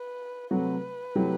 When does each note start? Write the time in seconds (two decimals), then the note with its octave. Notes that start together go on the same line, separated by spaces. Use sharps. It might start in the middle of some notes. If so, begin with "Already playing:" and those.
Already playing: B4
0.51 C3 F#3 A3 C4 F#4 B4
1.15 C3 F#3 A3 E4 G4